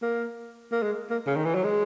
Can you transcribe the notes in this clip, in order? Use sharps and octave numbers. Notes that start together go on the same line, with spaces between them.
A#3
A#3
G#3
A#3
C#3
D#3
E3
F#3
G#3